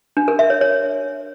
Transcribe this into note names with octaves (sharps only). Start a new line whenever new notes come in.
D4
A#4
E5
C#5
C#5